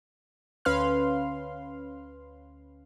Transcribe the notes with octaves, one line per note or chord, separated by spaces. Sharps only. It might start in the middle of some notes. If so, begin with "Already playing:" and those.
D2 C#4 B4 F5 C6 F6